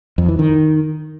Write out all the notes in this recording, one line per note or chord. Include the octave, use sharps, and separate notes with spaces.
F2
E3
D#3